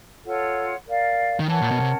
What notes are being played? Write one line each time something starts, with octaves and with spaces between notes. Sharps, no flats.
F4 A4 C#5 F#5
A#4 D5 F5
D#3
E3 A#4 C#5 F#5 A5
A#2
B2
C3